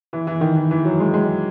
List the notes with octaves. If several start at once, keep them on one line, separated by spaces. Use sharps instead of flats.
E3
E3
D#3
E3
E3
F#3
G#3
G#3